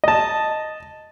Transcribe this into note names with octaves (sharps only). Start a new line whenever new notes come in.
D#5 A5